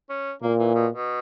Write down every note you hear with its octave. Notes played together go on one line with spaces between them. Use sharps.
C#4
A#2 A#3
E3
B2
B2